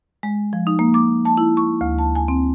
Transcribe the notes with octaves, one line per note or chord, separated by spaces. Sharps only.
G#3
F3
D#4
A#3
D6
A5
E4
C#6
D2
A5
G#5
C4